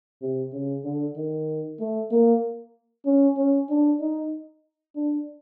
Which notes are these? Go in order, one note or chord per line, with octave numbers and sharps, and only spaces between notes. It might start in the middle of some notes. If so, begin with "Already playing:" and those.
C3
C#3
D3
D#3
A3
A#3
C#4
C#4
D4
D#4
D4